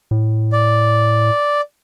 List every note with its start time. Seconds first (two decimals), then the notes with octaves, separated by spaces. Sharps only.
0.11 A2
0.53 D5